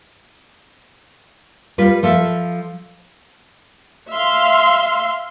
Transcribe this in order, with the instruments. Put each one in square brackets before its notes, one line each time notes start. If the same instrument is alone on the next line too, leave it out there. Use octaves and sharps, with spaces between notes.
[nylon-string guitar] G3 F4 B4
F3 A4 E5
[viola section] E5 F5 C6